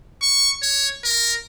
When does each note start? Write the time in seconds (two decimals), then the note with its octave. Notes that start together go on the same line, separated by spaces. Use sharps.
0.22 C#6
0.62 C#5
1.05 A#4